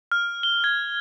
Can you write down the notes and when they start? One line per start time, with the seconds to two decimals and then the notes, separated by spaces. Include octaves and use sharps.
0.12 F6
0.43 G7
0.64 G#6